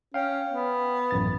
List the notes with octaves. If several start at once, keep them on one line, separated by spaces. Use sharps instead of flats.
C#4 F5 G5
B3
A1 F#2 A6